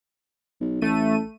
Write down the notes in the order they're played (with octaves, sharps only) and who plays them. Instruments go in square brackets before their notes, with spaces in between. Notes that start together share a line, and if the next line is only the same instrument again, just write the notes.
[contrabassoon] B1
[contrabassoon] A1 [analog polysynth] A3 D#7